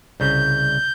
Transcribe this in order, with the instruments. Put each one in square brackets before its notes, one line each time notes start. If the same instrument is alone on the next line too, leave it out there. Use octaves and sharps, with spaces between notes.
[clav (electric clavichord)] C2 C#3 [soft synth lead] G6